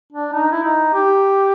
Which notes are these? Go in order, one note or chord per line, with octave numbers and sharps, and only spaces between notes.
D4
D#4
E4
D#4
G4